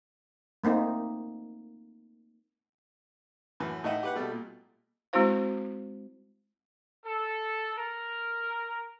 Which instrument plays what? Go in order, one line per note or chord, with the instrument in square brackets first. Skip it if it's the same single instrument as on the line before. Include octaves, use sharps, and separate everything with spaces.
[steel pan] A3 A#3 C4 D#4
[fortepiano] F#2 A2 E3
A2 D#4 D#5 E5 F#5 G5
G4 B4 F#5
B2 G3 A3
A#2
[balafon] G#3 C4 E4 F#4 C5 F5
[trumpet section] A4
A#4